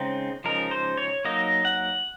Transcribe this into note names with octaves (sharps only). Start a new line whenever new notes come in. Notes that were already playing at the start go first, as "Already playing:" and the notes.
Already playing: C#3 G#3 C4 D#4 G#4
C#3 F3 G#3 D#4 A#4
C5
C#5
F#3 A#3 D#4 D#5
F#5